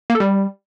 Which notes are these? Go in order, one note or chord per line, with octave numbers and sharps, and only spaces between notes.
A#3
A4
G3